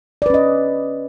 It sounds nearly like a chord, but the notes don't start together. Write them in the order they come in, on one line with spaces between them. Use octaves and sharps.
D5 B4 C#4 D#5